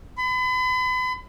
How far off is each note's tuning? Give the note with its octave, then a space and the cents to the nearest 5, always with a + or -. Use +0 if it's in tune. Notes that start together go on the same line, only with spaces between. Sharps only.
B5 +40